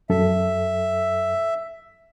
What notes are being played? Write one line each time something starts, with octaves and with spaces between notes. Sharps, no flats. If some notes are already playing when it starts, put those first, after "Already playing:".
F#2 A4 E5